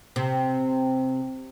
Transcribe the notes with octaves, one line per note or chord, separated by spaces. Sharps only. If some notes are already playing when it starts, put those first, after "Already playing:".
C3